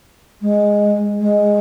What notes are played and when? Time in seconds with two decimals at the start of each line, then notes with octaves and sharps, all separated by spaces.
0.41 G#3
1.20 G#3